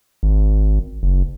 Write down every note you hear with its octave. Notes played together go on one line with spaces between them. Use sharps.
G#1
F#1